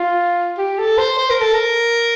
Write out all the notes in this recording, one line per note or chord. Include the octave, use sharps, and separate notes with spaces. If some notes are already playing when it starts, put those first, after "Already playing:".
Already playing: F4
G4
A4
C5
C5
A#4
A4
A#4